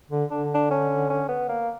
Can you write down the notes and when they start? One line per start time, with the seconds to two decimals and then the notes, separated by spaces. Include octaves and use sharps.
0.11 D3
0.31 D3 D4
0.54 D4
0.70 C#4
1.10 C#4
1.28 B3
1.49 A#3